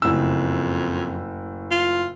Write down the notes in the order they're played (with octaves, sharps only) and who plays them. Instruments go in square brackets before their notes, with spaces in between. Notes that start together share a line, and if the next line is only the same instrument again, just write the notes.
[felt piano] F#1 A2 E6 [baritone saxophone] F2
[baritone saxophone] F4